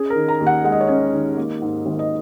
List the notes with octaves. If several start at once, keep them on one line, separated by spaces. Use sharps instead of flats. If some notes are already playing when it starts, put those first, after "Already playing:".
Already playing: C#4 G#4
A#4
D#3
A#5
D#2
F#5
G#3 F#5
D#5
C#5
C#4 D#5
D#3
A#3
G#2
G#1
D#5